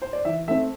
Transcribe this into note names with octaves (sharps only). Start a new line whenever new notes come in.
C5
D5
E3 E5
A3 C4 E5